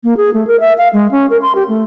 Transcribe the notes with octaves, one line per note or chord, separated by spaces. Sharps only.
A#3
G#4
A3
A#4
E5
F5
G#3
C#4
A#4
C6
G4
A3